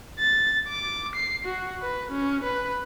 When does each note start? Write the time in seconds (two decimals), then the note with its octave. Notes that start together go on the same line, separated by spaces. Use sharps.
0.19 A6
0.69 D6
1.15 C7
1.45 F#4
1.82 B4
2.11 C#4
2.44 B4